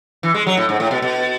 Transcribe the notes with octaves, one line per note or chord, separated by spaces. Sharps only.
E3
G#3
F#3
A2
G#2
A2
B2
B2